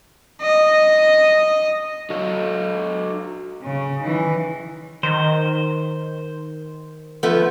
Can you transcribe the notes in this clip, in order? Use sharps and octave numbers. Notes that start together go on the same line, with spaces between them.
D#5
F#4 A4 D#5
C#3
D#3 E3
D#3 C5
F3 A3 B3